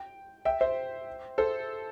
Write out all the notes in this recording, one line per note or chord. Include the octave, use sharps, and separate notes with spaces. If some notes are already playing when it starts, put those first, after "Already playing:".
Already playing: G5
E5 G5
C5 E5
A4 C5